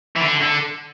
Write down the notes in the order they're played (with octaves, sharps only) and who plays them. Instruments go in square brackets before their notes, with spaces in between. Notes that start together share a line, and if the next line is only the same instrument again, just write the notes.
[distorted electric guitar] E3
D3
D3